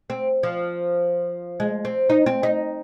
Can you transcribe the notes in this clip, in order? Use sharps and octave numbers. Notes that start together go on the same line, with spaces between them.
C4
F3
G#3
C4
D#4
C4
D#4